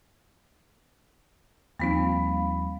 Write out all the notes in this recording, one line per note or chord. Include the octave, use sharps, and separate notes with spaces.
D#2 F3 G3 A#3 C4 D#4 F5 B5